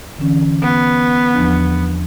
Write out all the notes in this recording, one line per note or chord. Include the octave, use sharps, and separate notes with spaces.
D3 E3 C#4
B3
E2 F3 D4